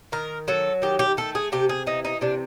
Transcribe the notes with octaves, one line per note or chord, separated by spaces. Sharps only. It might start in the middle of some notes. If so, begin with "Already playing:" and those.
D#3 A#4
F#3 A4
D#3 G4
G4
A3 A4
G#4
C3 G4
G#4
E3 D#4
D#4
C3 D4